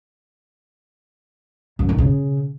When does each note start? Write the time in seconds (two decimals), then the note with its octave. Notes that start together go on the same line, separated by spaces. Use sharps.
1.79 F#2
1.89 D#3
1.98 C#3